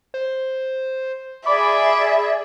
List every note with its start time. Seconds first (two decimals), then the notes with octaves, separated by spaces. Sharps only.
0.14 C5
1.46 G#4 D5 E5 B5 D6